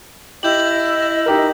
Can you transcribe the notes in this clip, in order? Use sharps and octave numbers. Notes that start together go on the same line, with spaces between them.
E4 G4 D#5 G6 F#7
D#4 G4 A#4